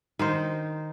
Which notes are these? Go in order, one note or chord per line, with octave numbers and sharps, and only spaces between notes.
D#3 D#4 C5